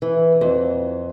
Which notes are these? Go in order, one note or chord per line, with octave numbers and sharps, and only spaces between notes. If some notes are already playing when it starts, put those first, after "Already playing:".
E3
F2